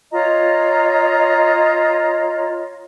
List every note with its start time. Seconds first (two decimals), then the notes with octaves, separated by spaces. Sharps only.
0.12 F4 C#5 D#5 A#5